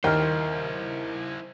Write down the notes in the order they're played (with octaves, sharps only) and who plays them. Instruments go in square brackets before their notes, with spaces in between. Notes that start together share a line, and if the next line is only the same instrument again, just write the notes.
[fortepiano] D#2 G5 [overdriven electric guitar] E4 C5 [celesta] A#4 D#5 F6